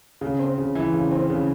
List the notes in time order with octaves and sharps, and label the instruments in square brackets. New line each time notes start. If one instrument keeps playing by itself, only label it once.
[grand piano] C#3
C4
C#3
E3
C#3
C4
C#3